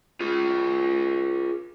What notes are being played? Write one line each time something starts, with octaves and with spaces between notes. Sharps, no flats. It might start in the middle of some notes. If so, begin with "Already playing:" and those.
F4 G#4